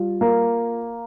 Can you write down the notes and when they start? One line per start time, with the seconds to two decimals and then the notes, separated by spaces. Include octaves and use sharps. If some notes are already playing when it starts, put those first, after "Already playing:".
Already playing: G3 F4
0.21 A#3